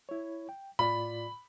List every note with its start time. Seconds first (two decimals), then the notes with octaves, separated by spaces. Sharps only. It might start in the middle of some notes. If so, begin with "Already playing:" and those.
0.09 E4 C#5
0.49 G5
0.79 A2 F4 D5 B5